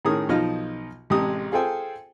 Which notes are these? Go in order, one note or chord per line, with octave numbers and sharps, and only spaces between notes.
A2 D#3 C#4 G#4 A#4 D#6
B1 F3 D#4 F4 D#5 F6
A1 C3 G#3 G4 G#4 D#6
F4 G#4 A4 C5 G5 G#5